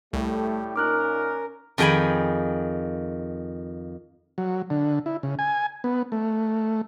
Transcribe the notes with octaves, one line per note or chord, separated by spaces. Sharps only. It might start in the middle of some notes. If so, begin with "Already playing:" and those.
C2 A2 G3 A3 G4
A#2 C#4 D#4 A#4 D6 F6 F#6
F2 D#3 G#4 G5 G#5 B5
F#3
D3
E4
C#3
G#5
B3
A3